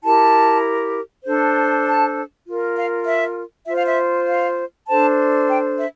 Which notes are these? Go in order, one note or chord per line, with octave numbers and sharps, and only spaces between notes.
E4 G4 A#4 A5
D4 A4 C5
A5
F4 A#4
F5
E5
F4 C5 E5
F5
E5
F5
D4 A4 C5 A5
G5
E5